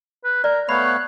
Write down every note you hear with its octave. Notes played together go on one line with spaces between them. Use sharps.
B4
A#4 D5
A3 B3 C#5 F5 B5 F#6